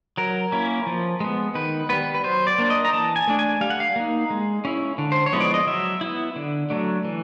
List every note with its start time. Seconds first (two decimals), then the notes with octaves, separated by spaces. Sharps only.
0.17 F#3 A#4
0.52 A#3 C#4 E4
0.87 F3
1.20 G#3 B3
1.55 D#3 B4
1.89 G3 B3 B4
2.15 B4
2.24 F#3 C5
2.47 D5
2.58 A#3 D4
2.70 D#5
2.85 A#5
2.92 E3 A5
3.16 G#5
3.27 A3 D4
3.39 G#5
3.61 G3 F5
3.70 F#5
3.80 F5
3.96 A#3 D#4
4.30 G#3
4.65 C#4 E4
4.98 D3
5.12 C5
5.26 C#5
5.33 F3 G#3 B3 E4
5.40 D5
5.54 D#5
5.67 F#3 E5
6.01 B3 E4
6.36 D3
6.70 F#3 A3 D4
7.05 E3